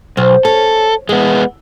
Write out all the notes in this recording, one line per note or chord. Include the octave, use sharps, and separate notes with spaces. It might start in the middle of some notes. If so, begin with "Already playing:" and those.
B1 C5
C#4 A4
E3 G#3 B3